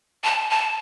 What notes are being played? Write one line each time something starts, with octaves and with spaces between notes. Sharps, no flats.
A5
A5